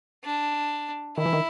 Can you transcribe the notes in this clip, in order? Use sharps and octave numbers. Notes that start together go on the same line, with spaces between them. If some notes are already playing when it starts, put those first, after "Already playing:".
D4
D#3 E4
E3
D#3